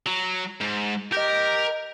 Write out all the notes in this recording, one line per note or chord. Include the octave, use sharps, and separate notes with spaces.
F#3
G#2
G4 A#4 D#5 G6